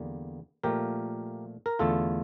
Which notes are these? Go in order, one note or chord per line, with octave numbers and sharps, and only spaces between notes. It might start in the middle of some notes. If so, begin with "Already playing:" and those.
Already playing: E2 D3 G3 A#3
A#2 F3 A3 G4 A#4
A#4
E2 D3 A3 F4 A4